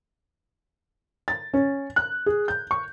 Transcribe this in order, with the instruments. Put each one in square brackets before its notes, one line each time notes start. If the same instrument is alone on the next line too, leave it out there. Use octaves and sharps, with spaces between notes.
[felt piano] A6
C#4
F#6
G#4
G6
C#6